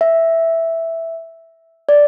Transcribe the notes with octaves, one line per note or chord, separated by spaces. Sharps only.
E5
D5